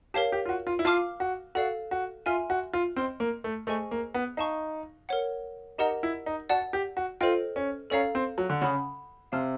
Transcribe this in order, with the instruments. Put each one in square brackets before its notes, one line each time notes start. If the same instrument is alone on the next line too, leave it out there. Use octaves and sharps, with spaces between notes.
[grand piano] G4 [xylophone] A#4 C#5 F5 A5
[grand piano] G4
F4
F#4
F4
E4
[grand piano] F4 [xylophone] F5 A5 D6 F6
[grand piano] F#4
[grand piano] F#4 [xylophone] A4 D5 F5
[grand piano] F#4
[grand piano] F4 [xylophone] E5 G#5 C6 F6
[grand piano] F#4
F4
[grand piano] C4 [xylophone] D#5 G5 C6 F6
[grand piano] A#3
A3
[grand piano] A3 [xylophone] G#4 C5 D#5 G#5 C#6
[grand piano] A#3
B3
[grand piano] D#4 [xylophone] F5 A5 C#6
[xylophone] A#4 C#5 F#5
[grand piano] D#4 [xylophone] G4 A#4 D#5 F#5 A#5
[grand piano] E4
D#4
[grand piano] F#4 [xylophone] D5 F#5 A5
[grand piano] G4
F#4
[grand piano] F4 [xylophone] A4 C5 D#5 G5
[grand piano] C#4
[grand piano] C#4 [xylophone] A4 D5 F5 A#5
[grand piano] C4
F#3
D3
[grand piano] C#3 [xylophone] F#5 B5 D#6
[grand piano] C3 [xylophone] F5 A5 C6 F6